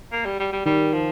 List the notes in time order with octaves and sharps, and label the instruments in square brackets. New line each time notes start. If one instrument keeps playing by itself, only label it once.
[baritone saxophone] A#3
G3
G3
G3
[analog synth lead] D#3 [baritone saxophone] G3
[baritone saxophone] F3